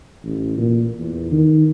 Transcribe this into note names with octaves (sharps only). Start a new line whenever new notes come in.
A1
A#2
E2
D#3